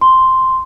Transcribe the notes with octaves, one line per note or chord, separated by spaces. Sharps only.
C6